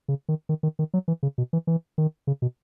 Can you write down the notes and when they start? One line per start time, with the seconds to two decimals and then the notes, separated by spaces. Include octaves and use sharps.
0.08 C#3
0.29 D#3
0.49 D#3
0.63 D#3
0.79 D#3
0.94 F#3
1.08 E3
1.23 C#3
1.38 B2
1.53 E3
1.67 E3
1.98 D#3
2.27 C#3
2.42 B2